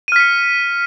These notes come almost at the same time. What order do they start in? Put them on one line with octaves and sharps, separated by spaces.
D#7 F6 B6 C#7